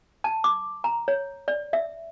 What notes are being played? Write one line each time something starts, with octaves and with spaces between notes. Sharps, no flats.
A5
D6
A#5
C#5
D5
E5